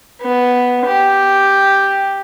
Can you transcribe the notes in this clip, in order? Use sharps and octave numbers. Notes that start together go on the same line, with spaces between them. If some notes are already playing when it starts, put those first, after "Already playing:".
B3
G4